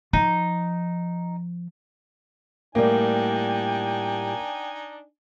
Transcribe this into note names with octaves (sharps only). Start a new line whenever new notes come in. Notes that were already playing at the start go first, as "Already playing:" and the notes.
F3 D#4
A2 G3 A#3 D4 D#4 G5 G#5